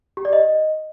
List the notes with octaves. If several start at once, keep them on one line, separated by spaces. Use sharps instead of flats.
G4
D5
D#5